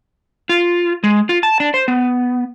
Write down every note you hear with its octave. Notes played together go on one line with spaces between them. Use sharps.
F4
G#3
F4
A5
D4
C5
B3